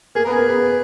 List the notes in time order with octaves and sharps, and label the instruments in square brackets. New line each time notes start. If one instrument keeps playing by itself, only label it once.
[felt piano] A#3 [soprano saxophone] G#4
[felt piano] B3 [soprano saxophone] A#4
[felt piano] A#3 [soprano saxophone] G#4
[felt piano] B3